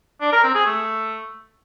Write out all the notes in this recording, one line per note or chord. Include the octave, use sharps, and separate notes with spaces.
D4
A#4
C4
G#4
A3